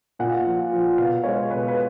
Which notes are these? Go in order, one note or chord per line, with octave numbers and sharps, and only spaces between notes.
A#2 F#5
F3
F3
B2 F5
G#3 C#5
B2 B4
B4